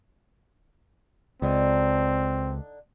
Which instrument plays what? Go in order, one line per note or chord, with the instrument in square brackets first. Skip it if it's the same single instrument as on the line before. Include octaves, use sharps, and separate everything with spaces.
[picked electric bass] C#2 [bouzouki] D3 D4 D#4 [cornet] C4